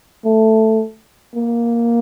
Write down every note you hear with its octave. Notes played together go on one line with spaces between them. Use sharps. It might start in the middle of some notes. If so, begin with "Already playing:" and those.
A3
A#3